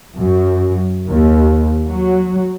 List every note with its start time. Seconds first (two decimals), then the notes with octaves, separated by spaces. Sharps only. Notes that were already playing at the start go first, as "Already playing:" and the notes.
0.16 F#2
1.09 D#2
1.88 F#3